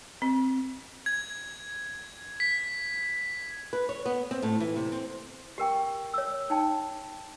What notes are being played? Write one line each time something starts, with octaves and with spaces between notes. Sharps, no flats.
C4
G#6
B6
B4
C#5
B3
C4
A2
E3
C3
C4
G4 A#4 G5 C#6
C#5 E6
D#4 G5 A5